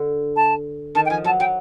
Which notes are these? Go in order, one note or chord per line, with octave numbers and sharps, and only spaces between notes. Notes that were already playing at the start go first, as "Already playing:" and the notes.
Already playing: D3
A5
D#3 A5
G5
F3 G#5
F#3 A5
F#3 G5